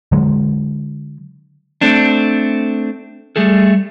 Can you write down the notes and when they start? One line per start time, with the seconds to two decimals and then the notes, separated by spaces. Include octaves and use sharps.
0.12 D3 F#3 G#3
1.81 A3 C4 D4
3.36 G3 A3 G#4 A4